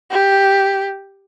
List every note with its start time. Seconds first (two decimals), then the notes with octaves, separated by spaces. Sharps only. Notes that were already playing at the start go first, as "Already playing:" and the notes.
0.11 G4